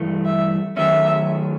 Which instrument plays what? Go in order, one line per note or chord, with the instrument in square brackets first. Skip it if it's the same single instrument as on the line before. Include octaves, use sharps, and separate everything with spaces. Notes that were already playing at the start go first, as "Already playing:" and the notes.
Already playing: [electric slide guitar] G2 E3 A3
[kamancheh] E5
[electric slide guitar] D#3 F#3 A3 C#4 [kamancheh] E5